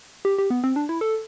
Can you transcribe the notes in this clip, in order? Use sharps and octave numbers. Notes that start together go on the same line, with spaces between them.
G4
G4
B3
C4
D4
E4
A4